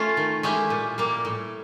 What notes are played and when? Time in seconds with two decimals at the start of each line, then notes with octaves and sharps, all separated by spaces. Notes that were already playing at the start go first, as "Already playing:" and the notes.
Already playing: A3 C#4 F4
0.17 D#3
0.43 G#3 C#4 E4 G4
0.70 A#2
0.98 G3 A#3
1.25 A2